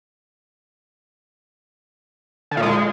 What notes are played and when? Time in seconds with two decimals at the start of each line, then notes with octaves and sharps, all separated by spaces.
2.51 D3
2.57 A#2
2.62 G#3